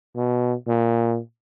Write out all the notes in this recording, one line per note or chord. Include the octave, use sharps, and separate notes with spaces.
B2
A#2